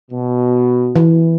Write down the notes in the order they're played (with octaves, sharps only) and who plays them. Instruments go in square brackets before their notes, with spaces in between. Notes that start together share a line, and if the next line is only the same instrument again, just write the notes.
[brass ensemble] B2
[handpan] E3